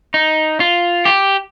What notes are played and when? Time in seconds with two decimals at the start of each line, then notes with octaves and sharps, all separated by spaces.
0.14 D#4
0.60 F4
1.05 G4